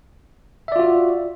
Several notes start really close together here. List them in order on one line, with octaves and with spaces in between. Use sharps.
E5 D5 F4 F#4